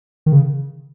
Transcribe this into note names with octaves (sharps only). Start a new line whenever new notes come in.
D#3
C#3